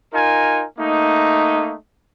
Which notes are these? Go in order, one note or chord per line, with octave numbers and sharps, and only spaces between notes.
D#4 F4 A#4 G#5
A3 A#3 D#4